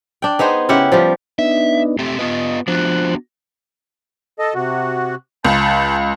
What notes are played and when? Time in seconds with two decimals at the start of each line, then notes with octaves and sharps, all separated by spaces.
0.22 D4 G5
0.39 B3 D#4 G#4 C5
0.69 C#3 E4 G4 F#5
0.92 F3 G3 G4
1.39 B3 D4 D#4 E5
1.99 A3 C4 G4
2.19 B3 F4 B4 D#5
2.68 F3 B3 D4 F#4 C5 F#6
4.39 A4 D#5
4.55 C3 F#4
5.45 C#2 A5 B5 G6